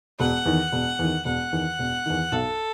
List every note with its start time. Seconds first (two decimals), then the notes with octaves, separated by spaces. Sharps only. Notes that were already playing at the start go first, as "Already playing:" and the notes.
0.19 E1 F#5
0.46 E2 D#3
0.72 E1
0.99 E2 D#3
1.25 E1 F#5
1.53 E2 D#3
1.79 E1
2.06 E2 D#3
2.32 B1 A4